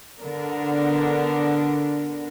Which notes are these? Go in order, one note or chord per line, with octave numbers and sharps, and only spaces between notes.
D3 B3 D4 A#4